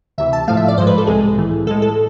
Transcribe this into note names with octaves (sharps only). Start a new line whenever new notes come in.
D2 C3 E3 E5
A5
A2 F3 A3 F5
E5
D5
G#2 F3 G#3 C5
B4
A4
C2 C3 G#3 G#4
A2 E3 A3
A2 G#3 A4
A4